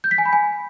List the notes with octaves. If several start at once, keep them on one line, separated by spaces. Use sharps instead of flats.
G6
B6
G#5
B5
G#5